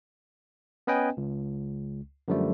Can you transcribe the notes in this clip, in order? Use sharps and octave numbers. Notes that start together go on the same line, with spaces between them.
B3 C#4 B4 D#5 G5 G#5
C#2
F#2 D3 F3 G3 A3